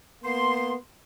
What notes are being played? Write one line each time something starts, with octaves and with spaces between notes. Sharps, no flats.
A#3 B3 C6